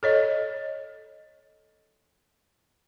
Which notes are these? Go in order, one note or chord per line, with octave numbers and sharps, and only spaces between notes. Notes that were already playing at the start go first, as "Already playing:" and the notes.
A4 C#5 D#5